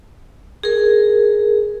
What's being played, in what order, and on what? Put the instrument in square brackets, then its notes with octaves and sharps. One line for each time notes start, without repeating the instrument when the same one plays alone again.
[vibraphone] G#4 A#4